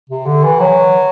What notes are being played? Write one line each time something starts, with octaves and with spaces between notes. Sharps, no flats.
C3
D3
E3
F#3